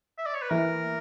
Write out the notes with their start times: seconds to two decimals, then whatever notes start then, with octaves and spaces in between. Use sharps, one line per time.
0.18 E5
0.26 D5
0.34 C#5
0.42 B4
0.51 E3 A#4